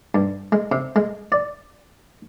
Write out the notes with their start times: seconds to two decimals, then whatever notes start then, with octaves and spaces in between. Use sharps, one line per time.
0.15 G2
0.52 G#3
0.72 C3
0.96 G#3
1.32 D5